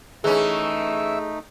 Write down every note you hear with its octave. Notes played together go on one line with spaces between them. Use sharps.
E3 A3 C#4 D#4 G#4 E5